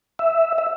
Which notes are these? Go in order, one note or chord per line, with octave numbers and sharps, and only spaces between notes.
E5
E5